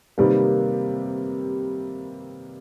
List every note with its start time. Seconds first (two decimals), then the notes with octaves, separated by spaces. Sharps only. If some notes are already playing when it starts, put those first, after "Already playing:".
0.18 C3 D#3 G3 A#3 B4